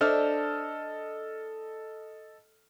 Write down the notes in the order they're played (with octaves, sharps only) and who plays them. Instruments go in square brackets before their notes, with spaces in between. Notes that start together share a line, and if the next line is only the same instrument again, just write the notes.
[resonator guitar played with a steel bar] D4 C5 E5 [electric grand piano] A4 D#5 F6